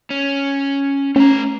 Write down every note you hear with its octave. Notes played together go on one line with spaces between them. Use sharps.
C#4
A3 C#4 A#5